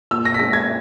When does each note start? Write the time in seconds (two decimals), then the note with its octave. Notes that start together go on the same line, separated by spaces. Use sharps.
0.11 A#2 E6
0.25 A#6
0.34 B6
0.39 G#3 C#4 A#6
0.53 G#6